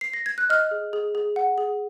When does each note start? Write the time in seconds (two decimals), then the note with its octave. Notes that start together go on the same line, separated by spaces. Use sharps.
0.01 C7
0.14 A#6
0.26 G#6
0.38 F#6
0.50 D#5 F6
0.71 G#4
0.93 G#4
1.15 G#4
1.36 F#5
1.58 G#4